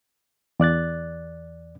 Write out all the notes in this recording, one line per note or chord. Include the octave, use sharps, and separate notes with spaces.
E2 D5 F#6 A6